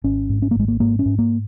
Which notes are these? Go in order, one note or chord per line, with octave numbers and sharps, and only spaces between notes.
G#1 C#4
G#2
C#4
A#3
G#1 G#3
A#3
G#2 A#3
C#4
G#2
A#3